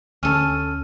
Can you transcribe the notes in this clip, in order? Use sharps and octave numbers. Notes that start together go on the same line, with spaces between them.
D2 C#4 A4 F6 D#7